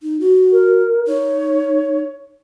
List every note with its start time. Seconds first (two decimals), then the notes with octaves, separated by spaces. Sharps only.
0.03 D#4
0.20 F#4
0.52 A#4
1.07 D#4 C#5